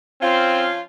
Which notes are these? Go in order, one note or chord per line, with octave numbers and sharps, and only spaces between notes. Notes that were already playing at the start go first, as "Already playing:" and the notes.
F3 C4 C#4 F4